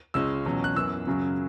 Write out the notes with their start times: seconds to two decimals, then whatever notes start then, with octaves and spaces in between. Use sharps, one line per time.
0.14 C#2 C#3 G#3 C#4 E6
0.46 E2 B2 F#3 C#4
0.64 F#6
0.76 F#2 E3 B3 E6
1.07 F#2 C#3 F#3 C#4